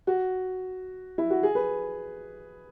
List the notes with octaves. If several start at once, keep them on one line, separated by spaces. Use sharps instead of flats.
F#4
E4
F#4
G#4
B4